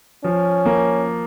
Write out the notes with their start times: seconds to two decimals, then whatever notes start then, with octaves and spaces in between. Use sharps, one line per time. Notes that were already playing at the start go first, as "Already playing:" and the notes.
0.24 F3 C#4
0.65 A#3